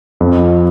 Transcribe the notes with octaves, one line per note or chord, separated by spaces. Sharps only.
F2